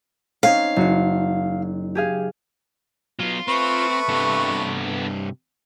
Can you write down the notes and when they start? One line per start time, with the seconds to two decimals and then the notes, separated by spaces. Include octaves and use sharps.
0.43 C4 C#4 D#4 F5
0.76 F#1 F#4 C7
1.95 G4 G#4 F5
3.19 F#3 B3 F4
3.48 A3 C4 B4 C#6
4.09 G2 C3 B3 A4